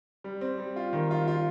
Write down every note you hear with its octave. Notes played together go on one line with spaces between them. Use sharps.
G3
C4
G3
F4
D#3
F4
F4